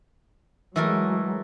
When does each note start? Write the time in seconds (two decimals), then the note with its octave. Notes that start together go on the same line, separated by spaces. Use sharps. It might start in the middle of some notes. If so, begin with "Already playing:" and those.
0.76 E3 F#3 G#3 A3 A#4